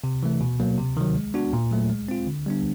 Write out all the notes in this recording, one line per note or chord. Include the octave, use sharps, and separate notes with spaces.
C3
E3 A3
B2
F#3 A#3
C3
D#3 F#3
G#3
B3 D4 F#4
A#2
F#3 A3
G#3
C4 F4
D3
G3 B3 D4